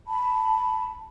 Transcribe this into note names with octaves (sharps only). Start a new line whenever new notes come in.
A5 B5